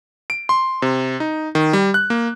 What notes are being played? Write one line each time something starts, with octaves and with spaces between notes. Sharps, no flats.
D7
C6
C3
D#4
D#3
G3
F#6
A#3